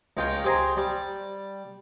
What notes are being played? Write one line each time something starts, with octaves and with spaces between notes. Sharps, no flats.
C#2 G#3 F4 G5
G4 G#4 C5 G#5 A#5
G3